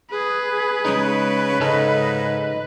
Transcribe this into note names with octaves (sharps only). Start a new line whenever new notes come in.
G#4 B4
C#3 G#3 D#4
G#2 C#3 C#4 A4 D#5